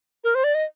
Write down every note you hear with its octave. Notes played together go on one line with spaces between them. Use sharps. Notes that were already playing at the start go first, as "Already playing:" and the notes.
A#4
C5
D5
D#5